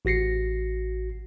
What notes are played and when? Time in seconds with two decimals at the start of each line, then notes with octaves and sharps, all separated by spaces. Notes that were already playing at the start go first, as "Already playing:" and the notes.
0.05 A1 F#4 A#6 C7 C#7